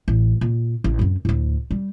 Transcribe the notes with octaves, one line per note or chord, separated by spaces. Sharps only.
A1
A#2
A1
F#2 C4
D2 A2
G3